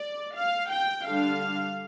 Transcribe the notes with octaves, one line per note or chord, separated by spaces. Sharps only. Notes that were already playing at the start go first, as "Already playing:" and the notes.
Already playing: D5
F5
G5
D3 G3 D4 F5